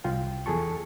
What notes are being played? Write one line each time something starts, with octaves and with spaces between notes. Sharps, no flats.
C2 F4 G5
E2 G#4 A4 A5 C#6